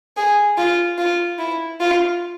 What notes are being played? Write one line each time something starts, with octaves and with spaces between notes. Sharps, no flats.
G#4
F4
F4
E4
F4